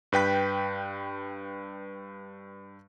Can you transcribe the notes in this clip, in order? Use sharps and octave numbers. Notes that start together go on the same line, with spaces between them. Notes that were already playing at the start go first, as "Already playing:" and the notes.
G2 B4 G5 B6